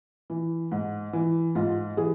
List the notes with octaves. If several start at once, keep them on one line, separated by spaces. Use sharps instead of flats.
E3
G#2
E3
G#2 F4
E3 G#4